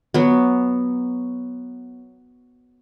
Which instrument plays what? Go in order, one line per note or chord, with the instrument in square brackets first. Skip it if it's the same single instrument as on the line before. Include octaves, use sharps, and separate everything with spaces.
[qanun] F#3 B3